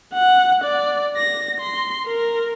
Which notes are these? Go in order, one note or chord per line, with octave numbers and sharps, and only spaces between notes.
F#5
D5
A#6
C6
A#4